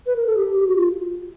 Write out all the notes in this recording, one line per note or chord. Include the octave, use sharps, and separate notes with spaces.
B4
A#4
A4
G4
G4
F#4
F4